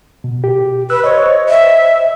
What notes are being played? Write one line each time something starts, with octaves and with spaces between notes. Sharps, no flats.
B2
G4
B4 E6 F#6
C5 C#5 D#5
E5